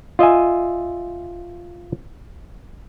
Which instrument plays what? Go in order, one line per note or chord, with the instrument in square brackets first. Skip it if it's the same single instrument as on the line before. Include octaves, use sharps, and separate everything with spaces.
[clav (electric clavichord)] F4 D#5 E5 G#5